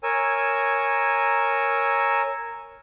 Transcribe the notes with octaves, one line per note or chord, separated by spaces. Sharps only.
A#4 C#5 G#5 E6